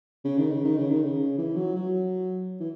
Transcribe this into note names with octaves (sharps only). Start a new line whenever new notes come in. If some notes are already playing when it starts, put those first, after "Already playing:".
C#3
D#3
C#3
D#3
C#3
D#3
C#3
E3
F#3
F#3
E3